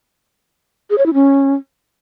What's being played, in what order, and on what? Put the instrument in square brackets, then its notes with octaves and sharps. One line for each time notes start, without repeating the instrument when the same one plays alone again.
[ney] G#4
C#5
E4
C#4